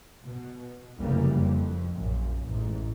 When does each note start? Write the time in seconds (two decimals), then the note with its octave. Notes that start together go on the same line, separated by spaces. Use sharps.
0.25 B2
0.97 F1 F#2 C#3 E3 G3 A#3
1.40 F2
1.96 A#1 F#2 A#2
2.45 A1 G#2